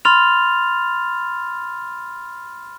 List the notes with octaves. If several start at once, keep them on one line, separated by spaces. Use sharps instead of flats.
B5 C6 F6 A6 F7